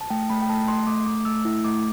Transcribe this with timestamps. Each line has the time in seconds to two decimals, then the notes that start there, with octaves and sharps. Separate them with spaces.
0.01 A5
0.10 A3 G5
0.30 A3 B5
0.42 G5
0.49 A3 A5
0.68 A3 C6
0.87 A3 D6
1.06 A3 D6
1.25 A3 E6
1.45 E4
1.64 A3 D6